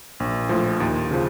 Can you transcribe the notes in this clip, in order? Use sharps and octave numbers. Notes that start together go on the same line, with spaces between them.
A#1
A2 F3
D#2
C#3 F3